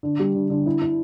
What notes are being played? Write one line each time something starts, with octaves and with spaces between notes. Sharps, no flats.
D3
G3
D3
D3
E4
E4